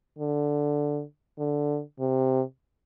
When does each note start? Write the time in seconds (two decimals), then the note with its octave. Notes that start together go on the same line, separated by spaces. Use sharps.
0.19 D3
1.39 D3
1.99 C3